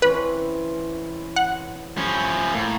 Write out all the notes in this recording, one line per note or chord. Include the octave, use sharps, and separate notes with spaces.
E3 C4 C#4 B4
F#5
F3 G3 C#4
A2 A#3